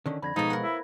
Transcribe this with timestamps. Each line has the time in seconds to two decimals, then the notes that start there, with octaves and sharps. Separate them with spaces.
0.06 D3 D#3 C#4
0.22 F2 D3 B5 G#6 A#6
0.36 B2 F3 G#3 D#4 A4 D#5
0.50 A#4 F#5
0.61 E4